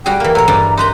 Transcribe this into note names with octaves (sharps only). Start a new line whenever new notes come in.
G3 F#4 G#4 G5
E3 A#3
A2 C#5 A#5
G2 E3 D5
D#4 B4 A#5 C6